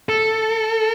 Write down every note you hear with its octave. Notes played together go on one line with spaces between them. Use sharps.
A4